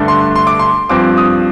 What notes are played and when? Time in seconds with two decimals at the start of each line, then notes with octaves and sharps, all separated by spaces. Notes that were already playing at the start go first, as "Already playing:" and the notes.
Already playing: G2 D3 A3 D4
0.08 C6
0.36 C6
0.47 D6
0.59 C6
0.89 G2 F3 C4 D6
1.17 D#6